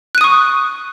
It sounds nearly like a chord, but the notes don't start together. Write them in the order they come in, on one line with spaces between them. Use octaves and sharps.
F#6 D#7 D#6 C#6